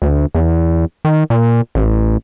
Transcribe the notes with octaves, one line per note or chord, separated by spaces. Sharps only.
D2
E2
D#3
A#2
A1